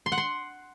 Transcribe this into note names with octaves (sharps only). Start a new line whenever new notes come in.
C6
F#5
C6